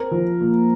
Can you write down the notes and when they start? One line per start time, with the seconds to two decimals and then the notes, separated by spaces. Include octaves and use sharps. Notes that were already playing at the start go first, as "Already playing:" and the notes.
Already playing: C4 A#4
0.11 F3
0.41 A#2